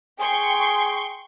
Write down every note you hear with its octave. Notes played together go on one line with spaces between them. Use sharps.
G#4 G5 C6 C#6